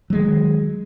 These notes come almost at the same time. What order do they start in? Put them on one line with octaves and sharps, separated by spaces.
F#3 G#3 D#3